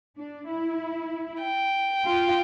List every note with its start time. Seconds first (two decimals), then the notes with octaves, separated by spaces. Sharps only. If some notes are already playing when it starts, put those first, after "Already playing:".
0.18 D4
0.49 E4
1.41 G5
2.03 F4